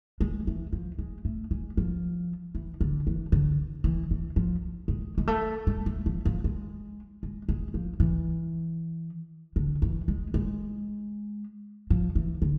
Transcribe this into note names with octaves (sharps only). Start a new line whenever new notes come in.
G#3
E3
F3
G#3
A3
G#3
F3
E3
D3
E3
D3
E3
E3
F3
G#3
G#3
A3
G#3
G#3
F3
F3
G#3
G#3
G#3
F3
E3
D3
E3
G#3
G#3
F3
E3
D3